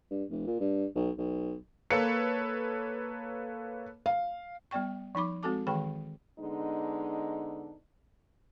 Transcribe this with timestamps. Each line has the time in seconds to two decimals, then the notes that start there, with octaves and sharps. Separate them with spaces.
0.11 G2
0.30 F1
0.47 A#2
0.60 G2
0.95 B1
1.18 B1
1.90 A#3 A4 B4 C#5 C#7
4.06 F5
4.71 G3 B3 D5 G5 C#6
5.15 F3 D#4 B5 D6
5.43 G#3 C4 F#4 A4 A5 D6
5.67 D#3 E3 G#3 G#4 G5 B5
6.40 D3 G#3 B3 D4 D#4